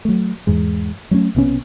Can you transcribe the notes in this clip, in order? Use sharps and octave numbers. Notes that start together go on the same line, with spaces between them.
F#3 A3
E2 G#2 G#3
F#3 A3 A#3 C#4
B1 C3 B3 C#4